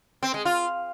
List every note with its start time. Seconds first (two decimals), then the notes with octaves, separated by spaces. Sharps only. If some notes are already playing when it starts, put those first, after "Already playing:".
0.23 C4
0.34 G#3
0.45 F4